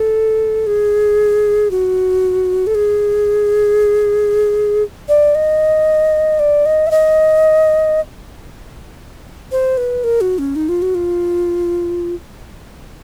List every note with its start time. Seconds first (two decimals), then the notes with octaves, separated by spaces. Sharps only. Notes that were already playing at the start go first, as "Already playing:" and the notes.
Already playing: A4
0.67 G#4
1.71 F#4
2.67 A4
2.75 G#4
5.09 D5
5.35 D#5
6.39 D5
6.66 D#5
6.87 E5
6.91 D#5
9.52 C5
9.77 B4
10.04 A#4
10.21 F#4
10.39 C#4
10.56 D#4
10.69 F4
10.82 F#4
10.95 F4